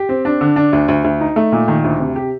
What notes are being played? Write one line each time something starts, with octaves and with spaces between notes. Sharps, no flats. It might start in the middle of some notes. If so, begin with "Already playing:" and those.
Already playing: G4
C4
D4
D3
D4
D2
D2
D2
D#4
A3
A#2
D#3
D2
C3
G4